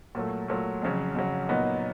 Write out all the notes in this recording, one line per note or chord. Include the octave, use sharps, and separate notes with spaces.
A#2 F#3 A3
A#2 F#3 A3
F2 C#3 F#3
F2 C#3 F#3
A#2 F#3 B3 D#4